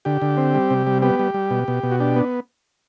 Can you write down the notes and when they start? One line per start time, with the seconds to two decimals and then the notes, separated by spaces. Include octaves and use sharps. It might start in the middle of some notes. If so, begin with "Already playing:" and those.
0.05 D3 G4
0.22 D3
0.37 C4
0.55 G3
0.70 C3
0.87 G3
1.02 B3 G4
1.19 G3
1.34 G3
1.50 B2
1.68 B2
1.83 B2
1.91 F#4
2.00 D4 G4
2.16 B3